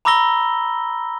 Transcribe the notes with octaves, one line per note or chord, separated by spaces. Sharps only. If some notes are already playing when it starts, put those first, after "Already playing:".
A#5 B5 D6 E6 A#6 G7